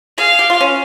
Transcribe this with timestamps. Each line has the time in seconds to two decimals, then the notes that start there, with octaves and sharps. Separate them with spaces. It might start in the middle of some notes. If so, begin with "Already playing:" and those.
0.18 G#4 F5
0.39 G4
0.50 F4
0.61 C#4